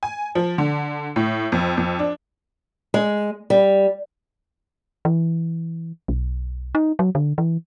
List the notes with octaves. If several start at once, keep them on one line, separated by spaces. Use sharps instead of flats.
G#5
F3
D3
A2
F2
F2
D4
G#3
G3
E3
B1
D#4
F#3
D3
E3